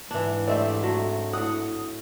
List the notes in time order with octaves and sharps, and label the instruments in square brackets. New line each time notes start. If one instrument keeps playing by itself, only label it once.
[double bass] G#2 [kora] E3 D4
[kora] A3 C4 G4 [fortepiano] D5 E5
[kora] F#3 A3
[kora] A2 F#5 [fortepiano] D#6